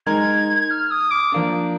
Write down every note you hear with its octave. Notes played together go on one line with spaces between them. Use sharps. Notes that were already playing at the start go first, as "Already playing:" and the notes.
G#3 D#4 A#4 G#6
F6
D#6
D6
F3 A#3 D4